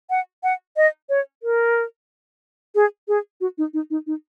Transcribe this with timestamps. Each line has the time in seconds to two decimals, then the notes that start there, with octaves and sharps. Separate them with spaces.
0.10 F#5
0.43 F#5
0.77 D#5
1.09 C#5
1.43 A#4
2.75 G#4
3.08 G#4
3.41 F#4
3.58 D#4
3.74 D#4
3.90 D#4
4.07 D#4